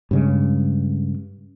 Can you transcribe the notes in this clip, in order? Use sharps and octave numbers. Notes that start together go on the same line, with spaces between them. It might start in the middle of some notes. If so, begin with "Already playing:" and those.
G2 C#3 G#3